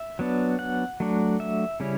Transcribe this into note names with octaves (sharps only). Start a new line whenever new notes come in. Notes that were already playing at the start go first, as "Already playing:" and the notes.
Already playing: E5
F#3 B3 D4
F#5
F#3 A3 D4
E5
C#3 G3 C#4 E4